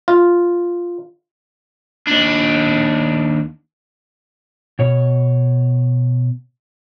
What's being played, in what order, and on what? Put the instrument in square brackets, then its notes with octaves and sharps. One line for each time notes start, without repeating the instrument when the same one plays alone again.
[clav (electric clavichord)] F4
[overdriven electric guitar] D#2 D4
[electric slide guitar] B2 C#5